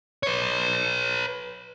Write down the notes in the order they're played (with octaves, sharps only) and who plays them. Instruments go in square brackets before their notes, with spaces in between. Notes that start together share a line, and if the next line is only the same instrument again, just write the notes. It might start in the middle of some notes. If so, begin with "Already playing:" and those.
[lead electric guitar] B4 C#5